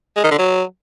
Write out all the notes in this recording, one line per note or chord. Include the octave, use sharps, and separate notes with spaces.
G#3
D#3
D3
F#3